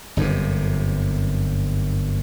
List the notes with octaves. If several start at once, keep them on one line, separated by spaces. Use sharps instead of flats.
G1 F#2 A2 C3